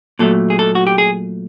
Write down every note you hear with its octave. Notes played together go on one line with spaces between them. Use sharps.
A#2 F#3 A3 A4
G#4
A4
F#4
G4
G#4